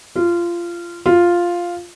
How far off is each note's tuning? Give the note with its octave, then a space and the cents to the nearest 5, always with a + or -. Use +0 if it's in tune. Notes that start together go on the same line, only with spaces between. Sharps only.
F4 -20
F4 +0